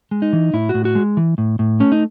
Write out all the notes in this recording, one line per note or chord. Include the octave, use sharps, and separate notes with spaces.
G#3
D#4
E3
A2 E4
F#4
A2
F#4
G#3
E3
A2
A2
A3 C#4
D#4